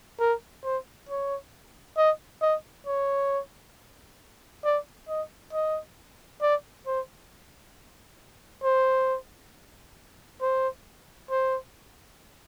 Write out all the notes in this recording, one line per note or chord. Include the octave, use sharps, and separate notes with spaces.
A#4
C5
C#5
D#5
D#5
C#5
D5
D#5
D#5
D5
C5
C5
C5
C5